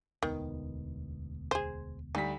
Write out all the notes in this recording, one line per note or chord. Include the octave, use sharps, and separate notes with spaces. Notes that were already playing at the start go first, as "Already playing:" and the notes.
E1 D2 D#3 B3
G#4 C5
D2 G3 D#4 B6